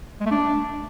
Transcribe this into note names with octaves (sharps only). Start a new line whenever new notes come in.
G#3
A3
D4